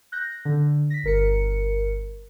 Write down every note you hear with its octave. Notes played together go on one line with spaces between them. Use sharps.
F#6 G6 A#6
D3
A#6 B6
G1 A#4 C#7